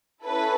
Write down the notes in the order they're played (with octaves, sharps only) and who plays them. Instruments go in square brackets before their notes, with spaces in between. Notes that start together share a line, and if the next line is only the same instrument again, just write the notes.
[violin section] C#4 E4 A4 B4